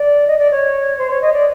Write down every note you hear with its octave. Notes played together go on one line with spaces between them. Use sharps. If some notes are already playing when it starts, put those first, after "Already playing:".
Already playing: D5
D#5
D5
C#5
C5
C#5
D#5
D5